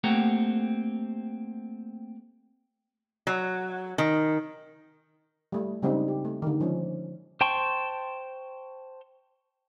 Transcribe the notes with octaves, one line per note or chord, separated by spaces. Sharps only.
A3 A#3 C4 G4 F#5 A#5
F#3
D#3
G3 A3
C#3 G3 G#3 C4 D4 D#4
G4
A3
D3 D#3
F3 G#3 C#4
C5 G5 A5 C6 C#6